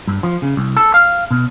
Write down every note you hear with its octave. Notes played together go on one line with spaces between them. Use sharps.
G2
F3
C#3
C2
A4
F5
B2